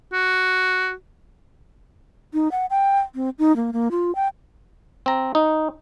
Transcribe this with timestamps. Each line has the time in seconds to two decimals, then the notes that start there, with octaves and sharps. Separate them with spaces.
0.13 F#4
2.34 D#4
2.51 F#5
2.70 G5
3.15 C4
3.39 D#4
3.56 A#3
3.73 A#3
3.91 F4
4.15 G5
5.06 C4 A#5
5.35 D#4